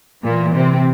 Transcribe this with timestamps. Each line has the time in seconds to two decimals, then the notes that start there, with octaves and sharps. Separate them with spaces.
0.23 A#2 E3 A#3
0.55 C3 C4